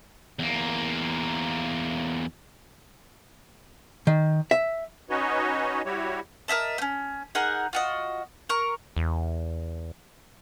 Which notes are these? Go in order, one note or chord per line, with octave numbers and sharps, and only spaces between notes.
E2 A#3
D#3
E5
C#4 D#4 F#4 B4 C#5 D#5
G3 E4 F#4 G4 C#5
A#4 D#5 E5 A5
A3 C#4
D#4 G#4 A#4 F#5
F4 F#4 D#5
A#4 C#6
E2